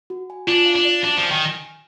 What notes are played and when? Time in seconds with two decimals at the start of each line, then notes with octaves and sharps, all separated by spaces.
0.10 F#4
0.30 G#5
0.47 D4 F4
0.66 F5
0.75 D4
0.85 D5
1.03 D4 F#4
1.17 F3
1.23 G#5
1.31 D#3